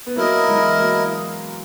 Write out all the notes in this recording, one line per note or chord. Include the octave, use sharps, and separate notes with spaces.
B3
F#3 A#3 E4 A#4 D#5
E3 G#3
F#3 A#3